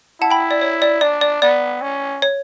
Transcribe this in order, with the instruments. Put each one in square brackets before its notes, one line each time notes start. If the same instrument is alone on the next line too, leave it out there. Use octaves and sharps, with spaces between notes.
[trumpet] E4 [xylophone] F#5 A5
[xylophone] G5 B5
D5
C#5
D5
[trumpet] D4 [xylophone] D5
[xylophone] D5
[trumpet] B3 [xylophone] D5
[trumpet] C#4
[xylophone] C#5